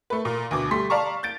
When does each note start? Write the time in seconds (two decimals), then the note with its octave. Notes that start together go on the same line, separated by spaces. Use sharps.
0.10 A3 B4
0.25 A#2
0.51 D2 B2 D6
0.71 G3 A3 C6 B6
0.90 D5 F5 A5 A#5 C#6
1.23 G6 A6 D7